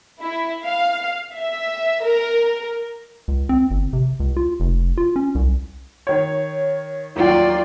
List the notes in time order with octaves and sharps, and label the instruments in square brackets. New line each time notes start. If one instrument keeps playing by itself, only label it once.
[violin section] E4
F5
E5
A#4
[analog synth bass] C#2
C4
G1
C3
C#2
F4
F1
F4
C#4
C2
[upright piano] D#3 C#5
[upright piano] D#2 F#3 G5 [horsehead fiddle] F4 D5